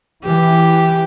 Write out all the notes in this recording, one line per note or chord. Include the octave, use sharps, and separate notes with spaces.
E3 G4